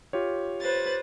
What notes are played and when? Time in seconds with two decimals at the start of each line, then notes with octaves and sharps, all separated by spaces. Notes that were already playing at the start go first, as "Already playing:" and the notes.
0.13 F4 G4 C#5
0.60 B4 C5 A6